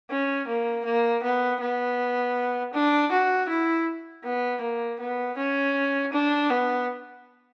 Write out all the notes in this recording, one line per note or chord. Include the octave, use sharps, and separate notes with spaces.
C#4
A#3
A#3
B3
B3
D4
F#4
E4
B3
A#3
B3
C#4
D4
B3